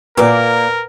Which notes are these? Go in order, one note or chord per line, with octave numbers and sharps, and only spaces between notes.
A#2 A#3 A#4 B4 D5 F#5